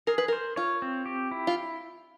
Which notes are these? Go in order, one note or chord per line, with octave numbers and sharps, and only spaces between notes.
G#4 A#4
B4
A#4 C5
F4 C#5
C4
G4
E4
F4